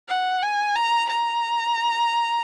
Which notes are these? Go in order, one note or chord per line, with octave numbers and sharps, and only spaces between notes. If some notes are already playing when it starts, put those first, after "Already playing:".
F#5
G#5
A#5
A#5